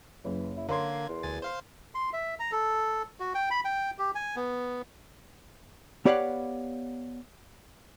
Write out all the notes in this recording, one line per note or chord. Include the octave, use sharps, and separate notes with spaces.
F#1 E3
E4
D3 A#3 A#4 C#5 C6 G#6
E2
D2 G#5 A6
C5 F5 C6
C6
E5
A#5
A4
F#4
G5
B5
G5
G4
G#5
B3
B3 G4 C#5 D5 F5 F#5